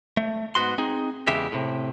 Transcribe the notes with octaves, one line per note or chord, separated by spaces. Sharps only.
A3
G#2 B3 F#4 C6
C4 D#4 G#4
E2 C#3 G#3 G4 E5
A2 C3